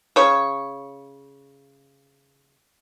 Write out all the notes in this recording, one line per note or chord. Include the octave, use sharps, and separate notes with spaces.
C#3 C#5